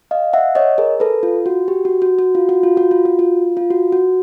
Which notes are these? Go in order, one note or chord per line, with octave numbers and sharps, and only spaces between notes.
D#5 F5
E5 F#5
C#5 D#5
G#4 A#4
A4 B4
F4
F#4
G4
F#4
F#4
F#4
F4
F#4
F4
F#4
F4
F#4
F4
F4
F#4
F#4